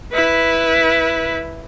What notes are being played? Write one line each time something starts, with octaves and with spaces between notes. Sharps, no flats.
E4 B4